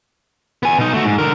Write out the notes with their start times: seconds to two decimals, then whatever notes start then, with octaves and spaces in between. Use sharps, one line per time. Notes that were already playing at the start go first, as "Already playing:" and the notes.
0.63 B3 G#5
0.78 B2 D#4
0.93 A3 F#4
1.05 G#2
1.19 D3 A#4